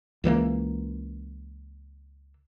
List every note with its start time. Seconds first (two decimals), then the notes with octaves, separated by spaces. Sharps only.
0.24 C#2 E3 G3 A#3